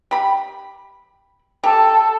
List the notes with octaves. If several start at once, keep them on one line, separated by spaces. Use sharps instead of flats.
G4 B5
G4 A4